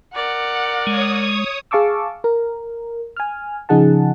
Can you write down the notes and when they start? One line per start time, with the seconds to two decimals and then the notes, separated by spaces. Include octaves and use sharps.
0.15 A#4 D5 F#5
0.87 G#3 C#5 D#6
1.71 G#4 F5 A5 C#6 D6 E6
2.24 A#4
3.16 G#5 F6
3.69 C#3 F3 D#4 G#4 F#5 A5